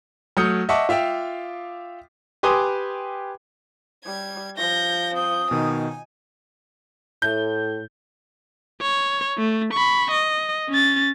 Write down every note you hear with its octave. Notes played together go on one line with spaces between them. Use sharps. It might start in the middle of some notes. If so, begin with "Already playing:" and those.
F#3 A3 D#6 F6 G6 C#7
D#5 E5 F#5 A5 C#6 D6
F4 E5 F5 G5
G4 B4 G#5 C6 D6 D#6
G3 G#6
F3 G6 A#6
C4 D#6 G6
B2 D#3 D#4 G#5
A2 G6
C#5
A3
B5 C#6
D#5
C#4 A6